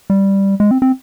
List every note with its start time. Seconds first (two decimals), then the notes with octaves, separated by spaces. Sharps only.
0.10 G3
0.60 G#3
0.71 C4
0.82 C4